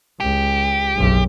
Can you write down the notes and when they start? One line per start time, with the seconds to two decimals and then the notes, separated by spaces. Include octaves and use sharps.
0.20 C#2 G4
0.95 F#1 B1